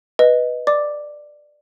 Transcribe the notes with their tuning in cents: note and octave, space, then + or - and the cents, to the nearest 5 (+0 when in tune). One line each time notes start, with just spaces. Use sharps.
B4 -5 D#5 +0
D5 +10 D6 +0